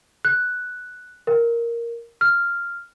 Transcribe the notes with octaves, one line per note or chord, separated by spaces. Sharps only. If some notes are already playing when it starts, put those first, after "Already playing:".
F#6
A#4
F6